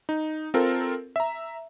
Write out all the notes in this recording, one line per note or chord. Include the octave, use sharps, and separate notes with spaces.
D#4
C4 F4 A4 A#4
E5 A#5